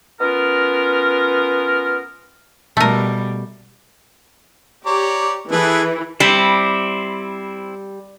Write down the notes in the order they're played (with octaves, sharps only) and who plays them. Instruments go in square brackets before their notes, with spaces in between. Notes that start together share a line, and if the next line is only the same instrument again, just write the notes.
[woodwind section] B3 C#4 F4 A#4
[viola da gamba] B2 G3 [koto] A3 A#4
[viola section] G4 [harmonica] C#5 D5 A#5
[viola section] E3 [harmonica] G#4 A4 B4
[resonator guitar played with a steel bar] G3 [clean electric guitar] C4 E4